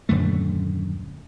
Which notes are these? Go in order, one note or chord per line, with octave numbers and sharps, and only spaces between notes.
D#1 F#2 D3 A3